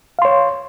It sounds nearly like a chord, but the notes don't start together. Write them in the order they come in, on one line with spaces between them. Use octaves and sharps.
F5 C6 C#5